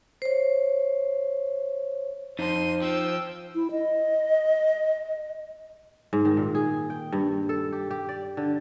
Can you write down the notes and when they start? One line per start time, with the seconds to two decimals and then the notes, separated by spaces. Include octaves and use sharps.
0.22 C5 C#5
2.39 F2 D#4 C5 A5 C6 D#7
2.82 F3 G5 E6
3.55 E4
3.72 D#5
6.13 G#2
6.25 D#3
6.37 A#2
6.55 G#4
6.90 G5
7.12 G2
7.49 A4
7.73 G4
7.91 G4
8.09 D5
8.37 D3